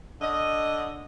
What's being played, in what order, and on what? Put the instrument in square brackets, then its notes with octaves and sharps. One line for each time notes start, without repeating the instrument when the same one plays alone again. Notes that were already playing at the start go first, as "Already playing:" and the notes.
[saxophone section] D3 D#5